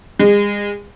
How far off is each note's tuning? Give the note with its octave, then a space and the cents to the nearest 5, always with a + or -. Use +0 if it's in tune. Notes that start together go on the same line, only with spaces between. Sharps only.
G#3 -30